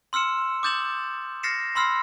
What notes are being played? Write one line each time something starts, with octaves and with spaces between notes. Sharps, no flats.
C6 E6 F6 C#7 E7
D6 D#6 G6 A6 E7 F#7
F6 A6 A#6 C7 C#7 E7
B5 C6 E6 F6 C7